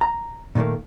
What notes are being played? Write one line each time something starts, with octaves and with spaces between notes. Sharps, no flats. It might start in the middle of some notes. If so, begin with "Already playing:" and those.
A#5
A#2 D#3 E3 A3 A#3